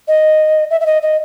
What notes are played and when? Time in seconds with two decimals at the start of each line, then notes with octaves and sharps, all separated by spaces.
0.08 D#5
0.70 E5
0.81 E5
0.86 D#5
1.02 D#5